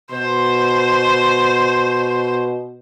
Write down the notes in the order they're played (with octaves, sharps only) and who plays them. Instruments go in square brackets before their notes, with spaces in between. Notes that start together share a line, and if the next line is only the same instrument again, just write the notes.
[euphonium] B2 [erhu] C5